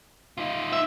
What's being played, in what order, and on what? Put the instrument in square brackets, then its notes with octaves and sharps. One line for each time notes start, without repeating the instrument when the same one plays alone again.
[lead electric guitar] D#4 F4
[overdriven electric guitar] E5